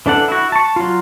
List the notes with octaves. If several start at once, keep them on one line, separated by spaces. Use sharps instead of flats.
E3 D4 A4 F#5
E4 F#4
A5 C#6
F#3 F4